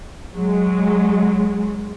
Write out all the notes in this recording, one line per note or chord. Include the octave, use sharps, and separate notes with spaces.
F#3 G#3